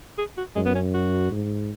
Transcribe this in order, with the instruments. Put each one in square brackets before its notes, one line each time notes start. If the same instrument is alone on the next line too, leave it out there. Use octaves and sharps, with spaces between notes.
[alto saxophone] G#4
F#4
[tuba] F#2 [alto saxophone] G#3
[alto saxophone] B3
C#4
F#4
[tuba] G#2